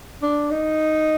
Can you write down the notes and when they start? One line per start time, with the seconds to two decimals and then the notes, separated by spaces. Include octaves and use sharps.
0.23 D4
0.51 D#4